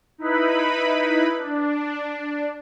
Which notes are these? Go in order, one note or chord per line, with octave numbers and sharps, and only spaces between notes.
D#4 E4 B4 B5
D4